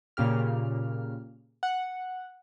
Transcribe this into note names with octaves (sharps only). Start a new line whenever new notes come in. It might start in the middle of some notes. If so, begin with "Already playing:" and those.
A#2 C#3 G4 F6
F#5